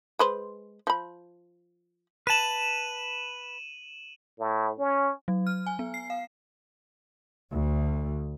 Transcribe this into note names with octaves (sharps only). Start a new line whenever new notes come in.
G#3 B4 C5
F3 B5
B4 A5 D#7 E7 F#7
A2
C#4
F#3
F6
G#5
B3
C7
F5
D2